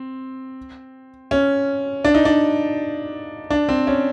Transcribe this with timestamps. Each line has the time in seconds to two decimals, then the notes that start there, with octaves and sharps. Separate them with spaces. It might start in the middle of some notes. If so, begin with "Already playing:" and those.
Already playing: C4
1.31 C#4
2.04 D4
2.14 D#4
2.25 D4
3.50 D4
3.69 C4
3.87 C#4